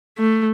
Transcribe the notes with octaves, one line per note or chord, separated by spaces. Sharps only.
A3